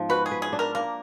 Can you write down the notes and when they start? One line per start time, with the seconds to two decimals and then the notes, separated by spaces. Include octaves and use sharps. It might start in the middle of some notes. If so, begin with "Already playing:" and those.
Already playing: G#2 F3 B3
0.09 F#4 B4
0.26 G#4
0.31 B4
0.42 G#4
0.53 D4
0.59 A#4
0.75 A#3 A#4